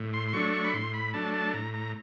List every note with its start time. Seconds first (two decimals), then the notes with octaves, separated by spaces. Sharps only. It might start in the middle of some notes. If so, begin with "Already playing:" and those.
Already playing: A2
0.14 C6
0.28 C6
0.33 F#3 A3 D4 C#6
0.53 C#6
0.64 B5
0.74 A2 C6
0.94 B5
1.14 F#3 A3 D4 A5
1.34 A5
1.54 A2 A#5
1.74 A#5